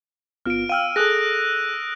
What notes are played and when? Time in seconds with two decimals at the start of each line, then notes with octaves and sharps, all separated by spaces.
0.46 G1 B3 F4 F6 D7
0.69 F5 G5 E6 F6 D#7
0.96 G#4 A4 D#6 F#6 A#6